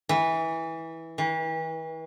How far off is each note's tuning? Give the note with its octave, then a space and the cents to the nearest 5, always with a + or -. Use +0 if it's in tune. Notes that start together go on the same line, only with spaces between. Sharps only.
E3 -15
E3 -35